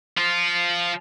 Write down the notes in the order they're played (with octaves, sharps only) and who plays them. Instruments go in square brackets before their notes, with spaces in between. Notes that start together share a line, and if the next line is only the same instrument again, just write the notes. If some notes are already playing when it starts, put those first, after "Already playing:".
[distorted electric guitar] F3 F4